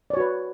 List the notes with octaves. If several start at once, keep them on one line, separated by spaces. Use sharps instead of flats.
F#4 B4 C#5 D5